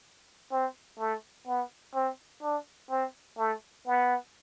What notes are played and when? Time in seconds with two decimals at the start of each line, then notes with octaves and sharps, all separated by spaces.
0.52 C4
0.99 A3
1.47 B3
1.94 C4
2.43 D4
2.90 C4
3.38 A3
3.86 B3